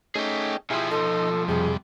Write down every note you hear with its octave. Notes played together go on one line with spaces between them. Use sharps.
A3 C#4 D#4 G#4 G5
B1 F3 E4 G4 G#4
D#4 A4
F2 C3 G3 G#4